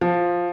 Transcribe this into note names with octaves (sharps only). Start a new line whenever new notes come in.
F3